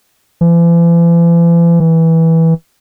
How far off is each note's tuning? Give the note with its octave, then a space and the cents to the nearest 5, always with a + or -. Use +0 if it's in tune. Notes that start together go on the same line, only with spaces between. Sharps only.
E3 +45
E3 -15